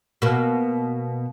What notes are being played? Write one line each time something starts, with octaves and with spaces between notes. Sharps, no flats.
B2 A#3